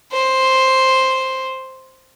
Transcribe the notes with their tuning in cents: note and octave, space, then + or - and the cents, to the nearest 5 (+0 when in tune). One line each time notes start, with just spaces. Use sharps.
C5 +5